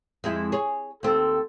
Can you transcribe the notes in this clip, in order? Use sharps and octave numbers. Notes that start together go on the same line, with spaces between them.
F2 G#3 E4
G#4 C#5
D#2 C4 A4